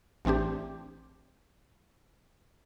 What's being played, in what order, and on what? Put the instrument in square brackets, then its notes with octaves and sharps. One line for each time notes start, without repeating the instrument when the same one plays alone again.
[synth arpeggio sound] A1 E3 C4 D4 G4